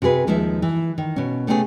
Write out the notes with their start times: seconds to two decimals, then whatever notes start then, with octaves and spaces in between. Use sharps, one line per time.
0.02 C3 F#4 G#4 B4
0.27 D#2 F3 G#3 D#4 E5
0.62 E3
0.98 D#3
1.16 B2 C#4
1.47 C3 A3 B3 C#4 E4 G#4